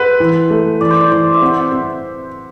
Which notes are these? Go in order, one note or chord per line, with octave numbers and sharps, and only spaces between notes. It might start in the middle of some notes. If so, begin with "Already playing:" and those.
Already playing: B4 C5 E5 F#5
E3
A3
E3 D5
C5
D5
E3 C5
E5
C4 F#5
F#5
C4 E5